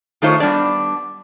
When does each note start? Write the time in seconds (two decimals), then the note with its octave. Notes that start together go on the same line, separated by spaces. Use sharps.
0.22 D#3 A3 D#4 F4 C5 C#5
0.40 G3 B3 D4 D5